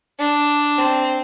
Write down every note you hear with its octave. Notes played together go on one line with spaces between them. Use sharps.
D4
C4